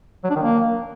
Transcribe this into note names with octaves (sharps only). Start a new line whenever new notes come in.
F#3
D4
D#3
A#3